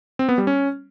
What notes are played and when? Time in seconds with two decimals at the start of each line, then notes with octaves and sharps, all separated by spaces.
0.19 C4
0.29 B3
0.38 G3
0.47 C#4